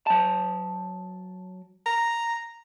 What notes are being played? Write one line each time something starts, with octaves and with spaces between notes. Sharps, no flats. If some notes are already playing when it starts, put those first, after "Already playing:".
F#3 A5
A#5